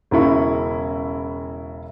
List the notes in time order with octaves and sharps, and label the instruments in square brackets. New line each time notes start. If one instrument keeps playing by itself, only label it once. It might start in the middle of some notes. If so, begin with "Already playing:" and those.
[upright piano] E1 C#3 E4 C#6